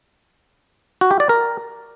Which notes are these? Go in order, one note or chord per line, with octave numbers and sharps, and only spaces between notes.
F#4
G4
D5
A#4